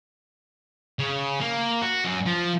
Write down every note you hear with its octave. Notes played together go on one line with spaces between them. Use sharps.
C#3
A#3
F#4
F#2
F3